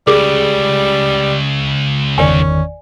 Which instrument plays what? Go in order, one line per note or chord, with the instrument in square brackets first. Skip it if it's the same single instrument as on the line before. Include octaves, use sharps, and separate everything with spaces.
[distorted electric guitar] C#2 C#3 [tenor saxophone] G3 [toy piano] G#4
[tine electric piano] G1 E2 D#3 [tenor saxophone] C#4 [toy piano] D5 G#5